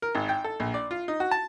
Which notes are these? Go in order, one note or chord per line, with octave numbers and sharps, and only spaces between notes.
A#4
G#1
G5
A4
A#1
D5
F4
D#4
F#4
A5